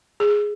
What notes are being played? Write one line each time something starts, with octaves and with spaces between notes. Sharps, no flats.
G#4